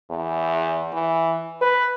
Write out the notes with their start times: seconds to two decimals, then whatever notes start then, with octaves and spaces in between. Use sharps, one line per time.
0.10 E2
0.92 E3
1.61 B4